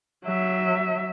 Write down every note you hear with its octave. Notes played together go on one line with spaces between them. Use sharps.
F#3 E5